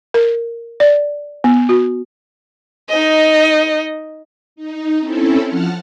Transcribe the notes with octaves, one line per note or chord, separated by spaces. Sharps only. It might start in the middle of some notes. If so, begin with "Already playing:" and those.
A#4
D5
B3
F#4
D#4 D#5
D#4
C4 C#4 E4 A4
F3 F#5 A5 F6